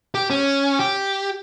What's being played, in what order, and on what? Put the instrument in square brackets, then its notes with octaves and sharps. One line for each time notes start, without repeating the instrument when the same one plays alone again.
[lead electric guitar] G4
C#4
G4